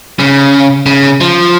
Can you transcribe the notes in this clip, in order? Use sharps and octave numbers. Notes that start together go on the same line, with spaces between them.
C#3
C#3
F3